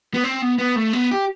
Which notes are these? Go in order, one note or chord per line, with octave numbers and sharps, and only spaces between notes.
B3
C4
B3
B3
A3
B3
G4